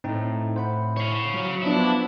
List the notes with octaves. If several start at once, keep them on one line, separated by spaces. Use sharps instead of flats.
A2 C4 D#4
C5 F#5 B5
C#5 F5
F#3
F3 B3 D4 E4